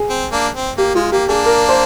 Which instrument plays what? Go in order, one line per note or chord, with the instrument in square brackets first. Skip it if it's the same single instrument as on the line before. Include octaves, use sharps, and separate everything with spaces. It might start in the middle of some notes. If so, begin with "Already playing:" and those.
Already playing: [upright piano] G#4
[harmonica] C4
A#3 D4
C4
[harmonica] A#3 [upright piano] G4
[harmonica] G#3 [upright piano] F4
[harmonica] A#3 [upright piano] G4
[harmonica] A#3 D4 [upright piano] G#4
[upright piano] A#4
C5